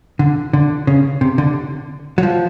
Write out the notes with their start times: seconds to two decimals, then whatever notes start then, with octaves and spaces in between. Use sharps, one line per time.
0.19 D3
0.53 D3
0.87 C#3
1.21 C3
1.38 D3
2.18 F#3
2.23 F3